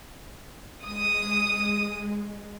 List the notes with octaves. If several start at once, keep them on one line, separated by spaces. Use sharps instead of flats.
G#3 D#6